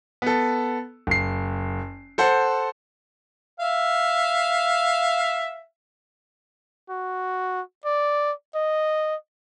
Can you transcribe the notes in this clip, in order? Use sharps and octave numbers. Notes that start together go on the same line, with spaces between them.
B3 A4
F#1 C7
A4 C5 F#5
E5 F5
F#4
D5
D#5